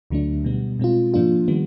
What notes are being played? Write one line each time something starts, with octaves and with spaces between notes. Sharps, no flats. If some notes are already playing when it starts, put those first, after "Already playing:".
D2 D3 F#3 A3 D4
B2 G3 B3
B2 G#3 C4 F4
G#2 F3 A#3 D4 F4
D#3 G3 B3